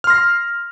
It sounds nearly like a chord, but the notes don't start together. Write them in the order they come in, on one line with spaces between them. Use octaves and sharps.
F6 C6 A#6